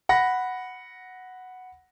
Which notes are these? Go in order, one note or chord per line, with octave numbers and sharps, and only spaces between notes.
F#5 B5 A#6